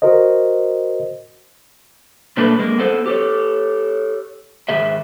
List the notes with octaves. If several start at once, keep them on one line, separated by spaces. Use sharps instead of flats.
F#4 A#4 C5 D#5
B2 A3 A#3 D4 A4 B4
G#3 A#3
B3 A4 C5
G4 A4 C#5
G#2 D#3 G#4 E5